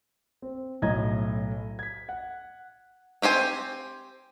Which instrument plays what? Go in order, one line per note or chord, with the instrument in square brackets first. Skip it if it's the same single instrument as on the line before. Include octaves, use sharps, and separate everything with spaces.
[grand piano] C4
B1 A2 E4 D#5 A#5 G#6
G#6 B6
F#5
[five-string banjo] C4 G4 C5 G#5